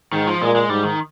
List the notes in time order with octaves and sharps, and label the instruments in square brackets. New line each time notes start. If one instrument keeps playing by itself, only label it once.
[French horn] G#2 [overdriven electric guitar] D#3
[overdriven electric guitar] F3
[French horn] A#2 [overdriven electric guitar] G#3
[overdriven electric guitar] G#3
[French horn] G#2 [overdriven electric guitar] G3
[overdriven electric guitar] D#3